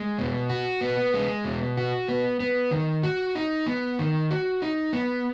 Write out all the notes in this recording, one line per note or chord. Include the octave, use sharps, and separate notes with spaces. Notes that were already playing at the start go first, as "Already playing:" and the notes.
Already playing: G#3
B2
F#4
B3
G#3
B2
F#4
B3
B3
D#3
F#4
D#4
B3
D#3
F#4
D#4
B3